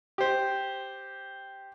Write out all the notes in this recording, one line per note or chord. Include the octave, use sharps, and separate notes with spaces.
G4 C5